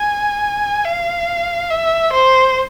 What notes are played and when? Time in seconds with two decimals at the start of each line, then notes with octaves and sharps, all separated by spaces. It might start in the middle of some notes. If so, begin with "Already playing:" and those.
Already playing: G#5
0.85 F5
1.70 E5
2.13 C5